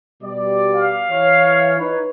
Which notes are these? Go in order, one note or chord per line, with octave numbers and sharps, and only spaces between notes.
B2 G3 D5
F5
E3 C#5
D#4 B4 C#5